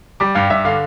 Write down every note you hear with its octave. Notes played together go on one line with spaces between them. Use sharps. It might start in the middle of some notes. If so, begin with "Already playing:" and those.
G3 D6
G2 F5
G2 E5
D3 F5